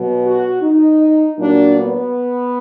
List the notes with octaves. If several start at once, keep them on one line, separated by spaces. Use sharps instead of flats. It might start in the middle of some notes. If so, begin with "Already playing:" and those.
Already playing: B2 F#3
F#4
D#4
A#2 F#3 D4
B3